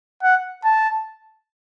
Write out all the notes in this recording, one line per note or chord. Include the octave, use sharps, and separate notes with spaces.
F#5
A5